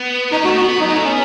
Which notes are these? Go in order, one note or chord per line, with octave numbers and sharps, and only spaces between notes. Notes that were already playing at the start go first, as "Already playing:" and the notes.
Already playing: B3
C#4 D#4
A3 F#4
B3 F#4
F#3 D#4
G#3
D#4
A3
B3 C#4